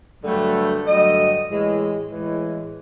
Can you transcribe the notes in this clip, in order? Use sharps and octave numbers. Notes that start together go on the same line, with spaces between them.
G2 D3 F#3 A3
G2 D3 F#3 A3 D#5
A2 E3 G#3
A2 E3 G#3